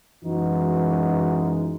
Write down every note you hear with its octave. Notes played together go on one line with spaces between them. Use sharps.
F#2 E3 G#3 D#4 F#4